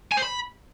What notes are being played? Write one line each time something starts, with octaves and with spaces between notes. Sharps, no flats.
G#5
C5
B5